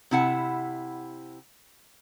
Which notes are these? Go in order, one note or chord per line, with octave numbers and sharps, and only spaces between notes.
C3 E4 F#5